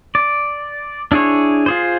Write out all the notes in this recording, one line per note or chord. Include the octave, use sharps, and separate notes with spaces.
D5
D4 E4 G#4 C#5
F4 G#4 C5